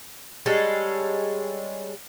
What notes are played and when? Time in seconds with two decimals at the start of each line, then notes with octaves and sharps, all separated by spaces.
0.46 G3 G#3 C#4 A4